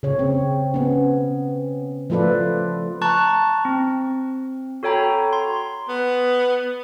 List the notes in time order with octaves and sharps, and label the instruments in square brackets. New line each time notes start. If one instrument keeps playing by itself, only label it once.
[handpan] C#3 C#5
C4
B3 C#4
F3 A3 F4 A4 B4 D5
[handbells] A5 A#5 C#6 F#6 A6
C4
F#4 A4 C#5 G5 A#5 B5
C6
[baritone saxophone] B3